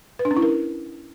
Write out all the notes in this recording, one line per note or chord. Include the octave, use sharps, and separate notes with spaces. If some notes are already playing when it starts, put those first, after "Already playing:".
B4
D4
C#4
E4
A#4